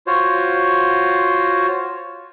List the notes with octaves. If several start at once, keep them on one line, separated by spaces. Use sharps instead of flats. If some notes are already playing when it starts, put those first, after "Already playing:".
F4 F#4 C5 C#5